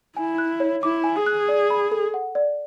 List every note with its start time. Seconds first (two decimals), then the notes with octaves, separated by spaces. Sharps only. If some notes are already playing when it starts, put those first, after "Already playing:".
0.17 E4 G#5
0.38 F#6
0.60 C#5
0.83 E4 D6
1.04 G#5
1.16 G#4
1.26 F#6
1.48 D5
1.70 B5
1.92 A4
2.14 F#5
2.35 D5